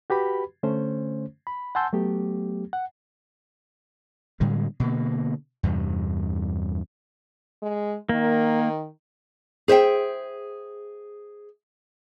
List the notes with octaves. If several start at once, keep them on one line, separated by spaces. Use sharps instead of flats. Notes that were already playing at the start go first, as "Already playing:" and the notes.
F#4 G4 B4 B5
D3 A3 C#4 C5
B5
F#5 G#5 A5 C6 E6 G6
F#3 A3 B3 G4
F#5
A2 D3 G3 G#3
B2 D3 A#3
E2 G2 C3
G#3
D#3 A#3
G#4 C5 E5 G5